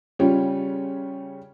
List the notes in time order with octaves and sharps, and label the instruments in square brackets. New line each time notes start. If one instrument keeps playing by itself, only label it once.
[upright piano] C#3 G3 C#4 F4